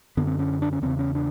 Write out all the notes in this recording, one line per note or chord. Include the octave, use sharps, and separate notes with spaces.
F#2 D3 B3
C4
C#4
D4
C#4
E2 C#3 C4
C#4
D4